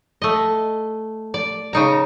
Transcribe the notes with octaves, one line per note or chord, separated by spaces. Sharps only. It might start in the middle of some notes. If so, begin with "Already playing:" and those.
A3 D#5
D5
C#3 D#4 A#5